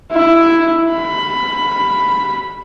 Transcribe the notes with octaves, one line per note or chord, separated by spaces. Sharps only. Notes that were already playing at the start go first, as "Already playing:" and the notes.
E4
B5